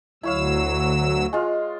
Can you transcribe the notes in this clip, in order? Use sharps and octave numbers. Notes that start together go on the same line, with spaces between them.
D2 F#3 E4 C#5 F5 E6
G#3 F4